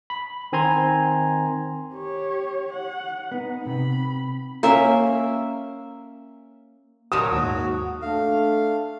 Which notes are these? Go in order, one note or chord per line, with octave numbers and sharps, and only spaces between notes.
B5
D#3 C4 G#5 A#5 C6 G#6
G4 C#5
F#5
B3 D#4
C3 B5
A#3 C#4 E5
A#2 F#3 F#4 A#4 A5 D#6
D#2 G#2 F#4
A3 D4 F5